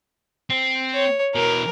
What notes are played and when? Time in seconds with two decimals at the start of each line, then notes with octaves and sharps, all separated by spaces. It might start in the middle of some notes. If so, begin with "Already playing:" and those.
0.50 C4
0.94 C#5
1.35 B2 E3 A#4